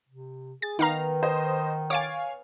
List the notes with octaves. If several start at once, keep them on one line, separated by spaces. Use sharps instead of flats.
C3
G#4 A6
D#3 B3 D#4 F5 A#5
C5 D#5
C#5 F5 G#5 D6 A6 D7